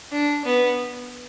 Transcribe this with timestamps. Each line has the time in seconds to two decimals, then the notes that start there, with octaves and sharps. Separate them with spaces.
0.12 D4
0.45 B3